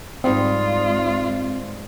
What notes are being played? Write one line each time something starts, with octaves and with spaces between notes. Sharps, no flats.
G#2 G3 C4 F4